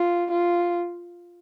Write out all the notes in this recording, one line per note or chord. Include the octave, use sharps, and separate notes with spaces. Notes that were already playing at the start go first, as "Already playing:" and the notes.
Already playing: F4
F4